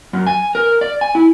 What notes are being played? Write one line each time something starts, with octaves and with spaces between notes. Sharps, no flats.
F#2
G#5
A#4
D5
G#5
E4